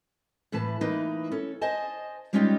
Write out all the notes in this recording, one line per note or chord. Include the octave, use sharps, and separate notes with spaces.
A2 E3 B4 A5
E3 A#3 D#4 B4
C#4 A4
C5 D#5 G#5 A5
G3 G#3 C#4 D#4 F4 G4